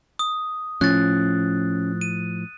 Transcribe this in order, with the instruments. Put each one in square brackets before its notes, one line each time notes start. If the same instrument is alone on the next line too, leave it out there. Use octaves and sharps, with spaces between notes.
[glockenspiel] D#6
[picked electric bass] A2 F3 [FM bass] C#4 [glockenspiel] F#6 A6
[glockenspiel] D#7